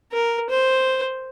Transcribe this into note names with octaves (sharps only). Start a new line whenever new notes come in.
A#4
C5